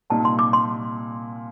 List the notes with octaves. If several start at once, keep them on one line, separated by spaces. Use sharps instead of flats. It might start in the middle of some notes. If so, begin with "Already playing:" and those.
C2 A#2 G3 A#3 D#4 A5
C6
D6
C6